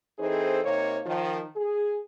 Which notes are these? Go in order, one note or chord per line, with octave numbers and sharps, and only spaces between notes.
E3 C4 D#4 G#4 A4 C5
C3 A#3 D#4 C5 C#5
D#3 F3
G#4